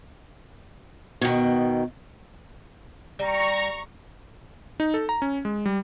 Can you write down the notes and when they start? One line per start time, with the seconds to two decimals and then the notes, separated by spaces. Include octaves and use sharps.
1.21 B2 D#3
3.19 G3 A#5 C#6
4.80 D#4
4.94 A4
5.09 A#5
5.22 C#4
5.45 G#3
5.66 G3